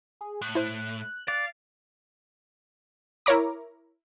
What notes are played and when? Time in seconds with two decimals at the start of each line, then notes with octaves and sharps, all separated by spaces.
0.21 G#4
0.42 A2 F#6
0.55 E4 C5
1.28 D5 F5
3.26 E4 A#4 C#5 A#5 D6